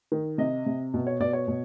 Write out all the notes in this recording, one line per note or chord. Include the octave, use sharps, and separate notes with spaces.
D#3
C3 D#5
C3
B2
C#5
B2 D5
C#5
B2